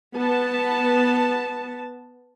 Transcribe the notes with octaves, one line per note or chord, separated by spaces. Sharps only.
B3 A5